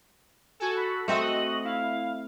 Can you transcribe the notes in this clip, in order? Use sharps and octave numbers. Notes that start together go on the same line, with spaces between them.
F#4 A4 G#5
B5
A3 C4 F#4 D#5 E5
F#7
E4 F5